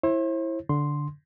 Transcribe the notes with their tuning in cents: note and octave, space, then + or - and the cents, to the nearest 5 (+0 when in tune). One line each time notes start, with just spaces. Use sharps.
E4 +0 C5 +40
D3 -10 C6 +0